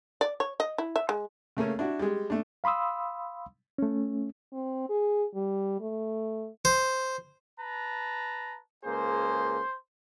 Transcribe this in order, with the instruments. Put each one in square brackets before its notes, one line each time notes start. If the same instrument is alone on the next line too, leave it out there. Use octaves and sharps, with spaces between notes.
[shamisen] D5
C#5
D#5
E4
E5
G#3
[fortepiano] C#3 A3 A#3 C#4
D4 E4 F#4
G3 G#3
A3 D4
[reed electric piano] F5 B5 C6 D#6 E6
A3 C#4
[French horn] C4
G#4
G3
A3
[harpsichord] C5
[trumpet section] B4 A5 A#5
[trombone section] C#2 A#3 G#4 [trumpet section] C5